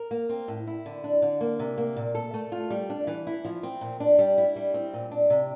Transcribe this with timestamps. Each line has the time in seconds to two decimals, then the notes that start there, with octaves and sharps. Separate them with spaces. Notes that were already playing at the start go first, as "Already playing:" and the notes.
Already playing: A#4
0.11 A#3
0.29 C4
0.48 A2
0.67 E4
0.86 D3
1.04 D4
1.22 D3
1.41 A#3
1.59 C3
1.78 A#3
1.96 A#2
2.15 A4
2.34 A3
2.52 F4
2.70 G3
2.90 D4
3.07 E3
3.27 E4
3.45 F3
3.63 C4
3.81 A#2
4.00 D4
4.19 G3
4.38 E4
4.56 G3
4.74 C4
4.94 A#2
5.11 D4
5.30 C3